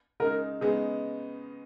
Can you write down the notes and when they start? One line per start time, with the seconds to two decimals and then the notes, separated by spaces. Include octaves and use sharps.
0.20 C#3 G#3 D#4 A#4
0.61 C#3 G#3 B3 D#4 G#4